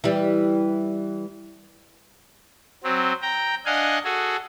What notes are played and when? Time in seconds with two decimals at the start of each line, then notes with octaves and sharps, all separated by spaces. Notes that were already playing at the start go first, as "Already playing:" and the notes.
0.04 E3 G3
2.84 F#3 C4
3.22 G5 A#5
3.66 D4 D#5 F5 F#5 G#5
4.04 F#4 G#4 A4